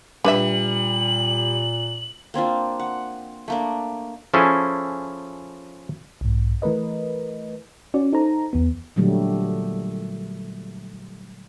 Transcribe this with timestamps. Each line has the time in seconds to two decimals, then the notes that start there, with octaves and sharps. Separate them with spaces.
0.24 A#2 G3 D4 B4 E5 F#7
2.34 A#3 C4 D4 F4
2.80 F#5
3.48 A3 A#3 D4
4.34 F3 C#4 E4 G#4 A4
6.21 B1 G#2
6.62 E3 A3 A#4 B4 D#5
7.94 C#4 F#4 D5
8.13 D#4 A4 C5 A#5
8.53 E2 B3
8.96 A#2 D3 F#3 G3 A3